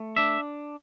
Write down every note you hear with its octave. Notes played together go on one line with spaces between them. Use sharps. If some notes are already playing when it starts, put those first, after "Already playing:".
Already playing: A3
D4 E5